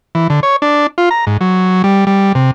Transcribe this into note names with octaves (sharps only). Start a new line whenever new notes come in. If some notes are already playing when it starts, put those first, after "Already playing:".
E3
D3
C#5
D4
F4
A#5
G#2
F#3
G3
G3
C3